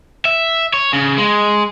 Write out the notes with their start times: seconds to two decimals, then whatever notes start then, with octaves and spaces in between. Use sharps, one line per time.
0.25 E5
0.74 C#5
0.93 C#3
1.18 G#3